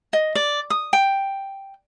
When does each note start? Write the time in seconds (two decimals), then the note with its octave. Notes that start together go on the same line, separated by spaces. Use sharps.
0.13 D#5
0.35 D5
0.70 D#6
0.93 G5